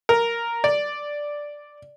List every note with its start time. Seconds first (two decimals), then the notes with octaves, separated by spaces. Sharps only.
0.09 A#4
0.64 D5